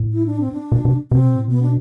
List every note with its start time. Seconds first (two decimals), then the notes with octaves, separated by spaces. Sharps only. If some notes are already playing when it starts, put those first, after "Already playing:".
Already playing: A2
0.13 E4
0.26 D4
0.40 C4
0.53 D4
0.72 B2
0.85 C3
1.11 C3 C4
1.23 B2
1.36 A2
1.48 B2 B3
1.62 D4